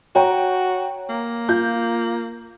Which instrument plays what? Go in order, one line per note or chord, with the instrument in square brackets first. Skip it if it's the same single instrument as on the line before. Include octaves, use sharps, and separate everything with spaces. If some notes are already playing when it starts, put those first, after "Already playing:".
[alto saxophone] F#4 [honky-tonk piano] C#5 G5 A#5
[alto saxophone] A#3
[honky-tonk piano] F4 G6